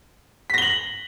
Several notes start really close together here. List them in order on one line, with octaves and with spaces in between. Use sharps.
B6 A#6 G7 F#7